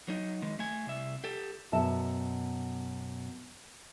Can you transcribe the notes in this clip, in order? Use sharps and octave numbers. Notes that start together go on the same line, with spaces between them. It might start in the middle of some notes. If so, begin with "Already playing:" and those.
F#3 D#4
D#3 G#3
A3 G#5
C2 E5
G4 A4
F#2 B2 E5 A5